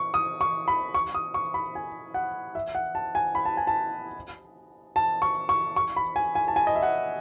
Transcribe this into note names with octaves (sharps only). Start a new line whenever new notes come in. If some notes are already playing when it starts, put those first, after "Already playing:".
Already playing: C#6
D#6
C#6
B5
C#6
D#6
C#6
B5
G#5
F#5
E5
F#5
A5
G#5
B5
A5
G#5
A5
A5
C#6
C#6
C#6
B5
G#5
G#5
A5
G#5
D#5
E5
F#5